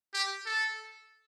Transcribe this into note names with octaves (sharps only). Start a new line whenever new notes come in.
G4
A4